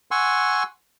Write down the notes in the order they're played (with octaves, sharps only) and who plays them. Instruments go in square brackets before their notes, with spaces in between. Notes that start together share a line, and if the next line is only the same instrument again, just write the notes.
[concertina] F#5 G#5 C6 C#6 E6